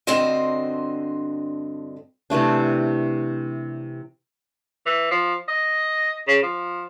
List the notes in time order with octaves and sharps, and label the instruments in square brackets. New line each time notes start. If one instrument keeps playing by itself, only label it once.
[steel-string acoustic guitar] G2 D3 C4 F#4 C5 D#5
[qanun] C3 E3 A3 D4
[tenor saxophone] E3
F3
D#5
C#3
F3